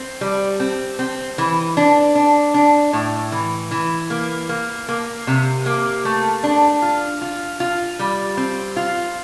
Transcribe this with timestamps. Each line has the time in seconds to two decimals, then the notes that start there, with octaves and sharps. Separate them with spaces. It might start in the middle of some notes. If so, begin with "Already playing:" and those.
Already playing: C4
0.21 G3
0.60 C4
0.99 C4
1.38 E3
1.77 D4
2.15 D4
2.54 D4
2.93 A2
3.32 E3
3.71 E3
4.10 A#3
4.49 A#3
4.89 A#3
5.27 C3
5.66 A#3
6.05 A3
6.44 D4
6.82 F4
7.22 F4
7.60 F4
7.99 G3
8.37 C4
8.76 F4